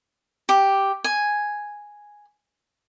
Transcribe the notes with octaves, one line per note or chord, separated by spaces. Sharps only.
G4
G#5